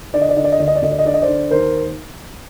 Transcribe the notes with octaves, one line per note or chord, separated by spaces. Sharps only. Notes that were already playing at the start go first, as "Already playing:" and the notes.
D3 D5
D#5
D5
D3 D#5
D5
D#5
D2 D5
D#5
D5
D2 D#5
D5
D#5
D3 D5
D#5
C5 D5
D3
D#2 A#4 C5